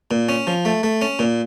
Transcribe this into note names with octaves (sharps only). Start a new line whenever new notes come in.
A#2
C#4
F3
A3
A3
C#4
A#2